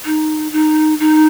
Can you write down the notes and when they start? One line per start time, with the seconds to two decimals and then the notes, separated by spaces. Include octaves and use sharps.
0.05 D#4
0.52 D#4
1.00 D#4